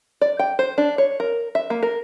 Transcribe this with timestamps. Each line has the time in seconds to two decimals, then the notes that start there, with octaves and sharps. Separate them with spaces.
0.21 D5
0.39 G5
0.59 C5
0.78 D4
0.98 C#5
1.20 A#4
1.55 E5
1.70 A#3
1.83 A#4